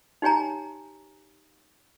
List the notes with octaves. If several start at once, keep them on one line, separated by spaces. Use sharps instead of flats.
D#4 G4 C#5 G#5 A#5